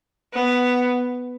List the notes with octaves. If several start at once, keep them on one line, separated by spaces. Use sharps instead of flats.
B3